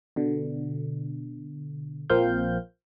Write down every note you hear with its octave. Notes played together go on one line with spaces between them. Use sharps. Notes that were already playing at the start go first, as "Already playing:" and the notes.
B2 D3
A#1 F3 A#3 C4 F5 G6